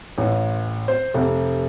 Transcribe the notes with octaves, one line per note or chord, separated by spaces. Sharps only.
A1
C5
F1